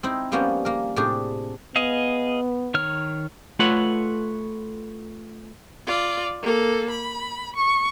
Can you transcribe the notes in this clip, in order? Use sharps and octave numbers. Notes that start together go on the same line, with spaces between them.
C4 D#4 E4
F3 G3 A#3 B3 C#4
A#3 A#4
A2 C3 D4 G4 G#4
B3 G#4 D#5 F5
D#3 C#5 F6
A3 F4 A4 B4 C#5 F#5
F4 D5
A#3 A4
B5
C#6